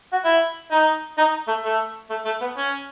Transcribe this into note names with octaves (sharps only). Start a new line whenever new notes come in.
F#4
E4
D#4
D#4
A3
A3
A3
A3
B3
C#4